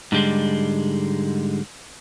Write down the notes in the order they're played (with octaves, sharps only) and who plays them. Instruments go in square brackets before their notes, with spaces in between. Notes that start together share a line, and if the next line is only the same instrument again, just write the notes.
[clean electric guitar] G#2 D3 G3 G#3